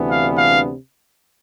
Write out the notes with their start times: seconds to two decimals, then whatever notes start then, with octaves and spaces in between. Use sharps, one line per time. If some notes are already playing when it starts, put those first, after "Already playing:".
Already playing: D2 C3 E3 B3 D4
0.08 F5
0.38 F5